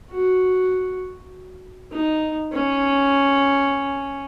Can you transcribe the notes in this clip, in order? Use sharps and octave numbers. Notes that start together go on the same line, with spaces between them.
F#4
D#4
C#4